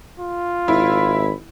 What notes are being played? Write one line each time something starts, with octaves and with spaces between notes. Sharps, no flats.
F4
G#1 E4 B5